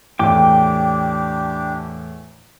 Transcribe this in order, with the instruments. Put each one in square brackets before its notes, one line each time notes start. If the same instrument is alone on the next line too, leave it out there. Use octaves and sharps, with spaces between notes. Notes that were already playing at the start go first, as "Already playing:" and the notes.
[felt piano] E2 A2 [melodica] D4 G4 [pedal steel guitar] G5 D6